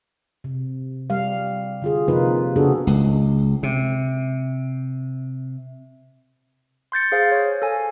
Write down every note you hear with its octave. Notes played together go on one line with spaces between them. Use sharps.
C3
G3 F5
D3 F4 G#4
C3 F3 A#3 D#4 F4 B4
C#3 B3 D4 F#4 G#4 A4
C#2
C3
C6 G6 A6 C#7
G#4 C5 F5
C#5
A4 G#5